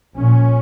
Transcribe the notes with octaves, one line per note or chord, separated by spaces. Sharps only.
A#1 A#2 C#4